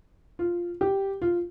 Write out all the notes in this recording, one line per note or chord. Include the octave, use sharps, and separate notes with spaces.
F4
G4
F4